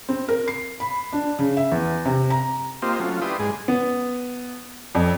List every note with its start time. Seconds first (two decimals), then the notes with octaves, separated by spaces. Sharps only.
0.09 C4
0.28 A#4
0.48 C7
0.80 B5
1.13 D4
1.39 C#3
1.57 E5
1.72 E2
2.06 C3
2.30 A#5
2.82 A#3 C4 F4 G4 C5 D#5
3.00 F#3 A3 C#4 F4
3.22 E4 G4 B4 D5 C6 D#6
3.40 G#2 G#3 G#4 D#5
3.68 B3
4.95 F2